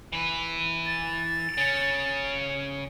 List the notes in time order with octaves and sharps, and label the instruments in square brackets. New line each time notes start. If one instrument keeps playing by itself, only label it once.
[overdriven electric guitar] E3 B4
[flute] A6
[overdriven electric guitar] C#3 C#4